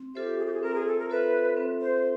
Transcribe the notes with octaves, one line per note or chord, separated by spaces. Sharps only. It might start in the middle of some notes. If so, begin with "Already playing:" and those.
Already playing: C4
F4 G4 A4 C5 E5
G#4
G4
G#4
C4 A#4
G#4
A4
A#4
F4 A4 B4 C5 E5
C4
C5